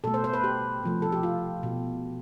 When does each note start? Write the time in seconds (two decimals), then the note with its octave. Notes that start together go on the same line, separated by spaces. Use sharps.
0.04 B2 A3 A4
0.14 C5
0.24 C5
0.34 B4
0.44 G4
0.84 C3 F3 A3
1.02 A4
1.12 G4
1.23 F4
1.63 B2